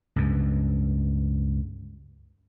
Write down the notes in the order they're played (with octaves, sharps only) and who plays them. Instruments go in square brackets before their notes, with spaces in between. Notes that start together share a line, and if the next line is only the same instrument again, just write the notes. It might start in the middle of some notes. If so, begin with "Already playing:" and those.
[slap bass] C#2 G2